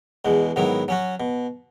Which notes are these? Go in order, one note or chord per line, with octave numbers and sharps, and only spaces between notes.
E2 B2 G#3
G#2 D#3 F#3 B3 E4
F#3 C#4 F#4
B2